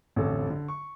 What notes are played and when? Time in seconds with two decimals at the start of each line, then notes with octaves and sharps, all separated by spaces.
0.16 A1 F2 D3 A4
0.50 D3
0.68 C#6